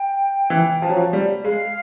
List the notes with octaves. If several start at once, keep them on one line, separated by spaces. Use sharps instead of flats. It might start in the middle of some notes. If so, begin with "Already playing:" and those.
Already playing: G5
E3
F3
F#3
F3
G3
G#3 F5